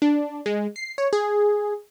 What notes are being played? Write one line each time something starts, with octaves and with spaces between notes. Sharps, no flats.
D4
G#3
C7
C#5
G#4